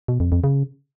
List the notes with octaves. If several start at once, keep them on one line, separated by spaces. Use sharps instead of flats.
B2
F2
F2
C#3